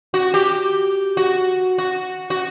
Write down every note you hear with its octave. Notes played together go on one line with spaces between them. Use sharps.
F#4
G4
F#4
F#4
F#4